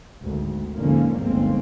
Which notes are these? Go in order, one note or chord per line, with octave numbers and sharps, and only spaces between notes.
G#1 D2
D#2 G#2 D3 F3 A#3 C#4
G1 D2 G#2 A#3 C4